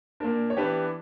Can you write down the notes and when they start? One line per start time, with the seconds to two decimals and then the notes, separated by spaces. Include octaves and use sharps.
0.20 A#2 A#3 D4 A#4
0.50 C#5
0.57 E3 B3 D4 G4 B4